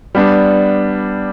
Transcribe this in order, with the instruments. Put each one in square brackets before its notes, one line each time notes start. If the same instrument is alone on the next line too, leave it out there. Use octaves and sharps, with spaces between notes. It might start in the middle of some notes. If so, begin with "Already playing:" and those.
[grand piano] G3 B3 D4